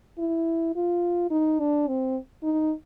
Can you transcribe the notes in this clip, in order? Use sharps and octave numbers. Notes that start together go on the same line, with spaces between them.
E4
F4
D#4
D4
C4
D#4